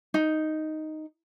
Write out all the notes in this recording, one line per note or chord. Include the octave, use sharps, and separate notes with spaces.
D#4